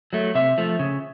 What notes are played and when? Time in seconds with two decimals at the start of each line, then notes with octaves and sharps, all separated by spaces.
0.13 F#3 A3
0.35 C3 E5
0.58 F3 A3
0.79 C#3